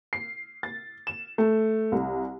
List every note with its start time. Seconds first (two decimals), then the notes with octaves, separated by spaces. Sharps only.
0.13 C7
0.63 A6
1.07 E7
1.38 A3
1.92 C2